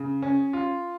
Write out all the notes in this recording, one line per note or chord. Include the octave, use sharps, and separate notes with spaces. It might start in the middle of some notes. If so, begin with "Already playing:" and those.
Already playing: C#3
C#4
F4